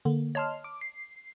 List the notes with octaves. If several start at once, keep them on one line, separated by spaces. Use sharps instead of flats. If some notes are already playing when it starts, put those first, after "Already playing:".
D3 A#3
C#5 D#5 A5 C6 F6
D6
C7